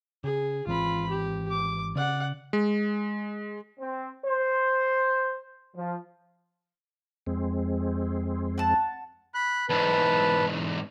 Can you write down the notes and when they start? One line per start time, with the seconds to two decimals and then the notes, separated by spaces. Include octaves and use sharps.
0.24 C#3 G#4
0.67 G#1 E3 C4 F4 B5
1.09 G4
1.50 D6
1.96 C#3 D5 F#5
2.53 G#3
3.80 C4
4.27 C5
5.77 F3
7.27 F2 G#3 C4
8.58 F#5 A5
9.35 B5 F#6
9.69 E2 G#2 B4 A5